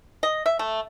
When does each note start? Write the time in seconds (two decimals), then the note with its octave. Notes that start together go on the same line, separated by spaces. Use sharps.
0.23 D#5
0.46 E5
0.59 A3